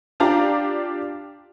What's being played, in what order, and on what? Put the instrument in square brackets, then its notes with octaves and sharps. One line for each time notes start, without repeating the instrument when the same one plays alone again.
[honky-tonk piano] D4 F4 G4 D5 A#5